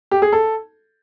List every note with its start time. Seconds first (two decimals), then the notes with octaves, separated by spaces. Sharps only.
0.11 G4
0.22 G#4
0.33 A4